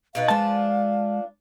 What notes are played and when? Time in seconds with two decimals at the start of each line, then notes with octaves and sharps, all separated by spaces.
0.15 B2 D#4 B4 F5
0.28 F3 G#3 B3 D4 A5